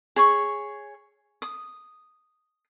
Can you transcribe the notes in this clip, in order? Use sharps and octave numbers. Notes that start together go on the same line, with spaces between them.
G#4 C#5 C#6
D#6